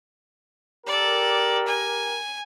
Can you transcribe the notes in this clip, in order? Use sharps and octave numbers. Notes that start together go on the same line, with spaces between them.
G4 A4 A#4 D5
G#5